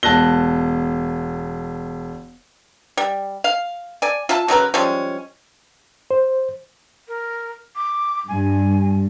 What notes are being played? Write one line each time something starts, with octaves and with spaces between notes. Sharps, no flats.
E1 A5 F#6 A#6 G7
G3
F5
D5 G#5
F4 E5 A5
C#3 F#3 A#4 B4
F3 G3 G#3 C#4
C5
A#4
D6
G2 G#5